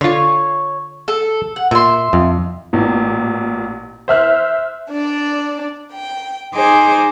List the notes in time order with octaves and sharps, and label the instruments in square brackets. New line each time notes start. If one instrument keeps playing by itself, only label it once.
[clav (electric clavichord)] D3 F4 [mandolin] C#5 C#6
[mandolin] A4
F#5
[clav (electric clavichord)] A#2 [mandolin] E5 C6
[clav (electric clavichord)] F2
[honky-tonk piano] A1 A#2
C5 E5 F6 F#6
[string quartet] D4 D5
G5
D#4 G#4 C5 G#5 D6